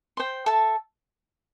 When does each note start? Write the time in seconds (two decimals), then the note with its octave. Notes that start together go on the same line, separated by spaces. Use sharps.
0.17 C5 G5 C6
0.46 A4 E5 A5